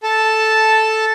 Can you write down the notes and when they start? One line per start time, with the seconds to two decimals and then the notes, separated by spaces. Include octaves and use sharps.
0.03 A4 A5